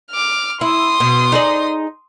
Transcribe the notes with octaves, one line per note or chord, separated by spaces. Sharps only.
D6 F6
E4 C6 D#6
B2
D#4 G#4 D5